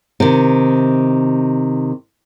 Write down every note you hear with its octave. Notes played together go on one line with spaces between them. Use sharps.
C3 D#3